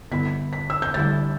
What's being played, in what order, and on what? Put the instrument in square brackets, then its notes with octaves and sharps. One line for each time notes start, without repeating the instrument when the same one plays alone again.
[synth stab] G2 D3 B3 E4 [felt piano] B6
[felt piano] B6
E6
G6
[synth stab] D2 D3 G3 E4 [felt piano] A6